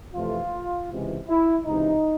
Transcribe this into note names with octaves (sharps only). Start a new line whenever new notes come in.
F2 C3 E3 A3 F4
C#2 C3 E3 G#3
E4
C#2 C3 E3 D#4